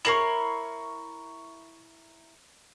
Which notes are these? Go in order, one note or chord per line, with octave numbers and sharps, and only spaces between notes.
E4 A#4 C#5 C#6 C7 F#7